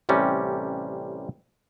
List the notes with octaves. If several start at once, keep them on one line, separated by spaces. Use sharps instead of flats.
A1 C3 G3 C#4